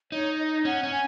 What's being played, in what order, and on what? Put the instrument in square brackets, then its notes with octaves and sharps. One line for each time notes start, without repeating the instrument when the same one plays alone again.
[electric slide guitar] D#4 [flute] C#5
[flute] D#5
[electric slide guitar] C#4 [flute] F#5
[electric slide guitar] C#4
[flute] G#5